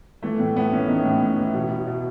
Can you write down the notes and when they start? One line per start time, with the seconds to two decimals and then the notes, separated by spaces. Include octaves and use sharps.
0.22 E3 A3
0.40 A2
0.56 A2 B3
0.72 E3 C#4
0.88 E3 D#4
1.05 A2
1.21 A2
1.38 E3
1.54 B2
1.71 B2
1.87 B2